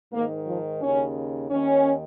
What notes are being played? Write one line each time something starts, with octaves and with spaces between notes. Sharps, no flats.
G#2 D#3 A#3
F3
D#2 C#3 C#4
D#2 D#3 C#4